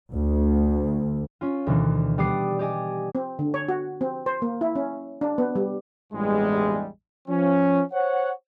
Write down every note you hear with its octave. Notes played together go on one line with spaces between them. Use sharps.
D2
C#4 F4
D2 B2 D#3 E3
G3 B3 D5 D#6 C7 D7
G4 D5 D#5 G#5
C4
D3
C#5
F#4
C4
C5
A#3
E4
C#4
D4
B3
G3
A1 E2 G2 G3 G#3
F3 C#4
C5 C#5 F#5